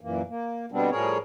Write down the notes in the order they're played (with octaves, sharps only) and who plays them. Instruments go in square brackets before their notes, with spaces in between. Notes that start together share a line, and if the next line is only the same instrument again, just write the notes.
[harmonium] F#2 A#2 E3 A#3
A#3
B2 D3 G3 B3 C4 D4
A2 F3 G3 G#4 A#4 C#5